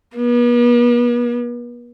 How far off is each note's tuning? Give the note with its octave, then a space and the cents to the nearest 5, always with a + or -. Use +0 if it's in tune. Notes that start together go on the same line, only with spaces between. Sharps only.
B3 -40